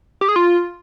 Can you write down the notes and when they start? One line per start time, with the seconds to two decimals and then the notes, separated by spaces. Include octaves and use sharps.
0.21 G4
0.29 G#4
0.36 F4